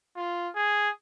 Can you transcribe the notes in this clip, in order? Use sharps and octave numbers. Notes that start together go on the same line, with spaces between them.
F4
G#4